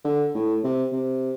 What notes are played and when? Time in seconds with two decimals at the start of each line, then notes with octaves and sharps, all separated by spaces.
0.04 D3
0.35 A2
0.64 C3
0.92 C3